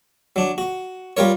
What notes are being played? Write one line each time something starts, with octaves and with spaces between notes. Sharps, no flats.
F#3 D4
F#4
G3 F4 A#4 C#5